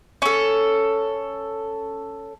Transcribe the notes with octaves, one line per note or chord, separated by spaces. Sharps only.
C#4 A4